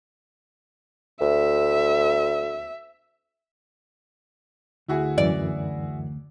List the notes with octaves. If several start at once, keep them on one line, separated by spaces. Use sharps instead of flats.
D2 E5
D2 E4 F#4 G#4
F#2 E3 D5